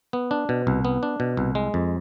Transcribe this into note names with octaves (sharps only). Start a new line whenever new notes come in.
B3
D4
B2
C2
B3
D4
B2
C2
G#3
F2